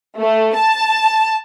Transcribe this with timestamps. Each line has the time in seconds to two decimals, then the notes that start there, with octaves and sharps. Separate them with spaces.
0.18 A3
0.54 A5